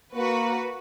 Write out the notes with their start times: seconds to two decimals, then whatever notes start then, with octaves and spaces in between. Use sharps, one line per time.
0.15 A#3 F#4 B4